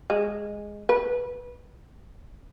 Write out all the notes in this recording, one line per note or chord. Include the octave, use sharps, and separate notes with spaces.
G#3
B4